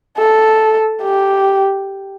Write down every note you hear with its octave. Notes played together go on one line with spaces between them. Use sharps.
A4
G4